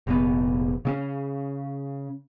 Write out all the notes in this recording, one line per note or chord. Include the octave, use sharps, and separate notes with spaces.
F1 A#1 B3
C#3 C4 C#4